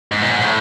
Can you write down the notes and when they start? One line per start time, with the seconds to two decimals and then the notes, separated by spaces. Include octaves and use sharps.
0.12 G#2
0.22 A#2
0.31 G#2
0.41 A2